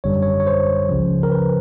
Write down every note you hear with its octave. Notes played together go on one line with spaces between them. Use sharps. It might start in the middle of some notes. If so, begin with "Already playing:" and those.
G#1 F#2 D3 G3 C#5
C#5
C#5
C5
C#2 C#3 F3
A#4
B4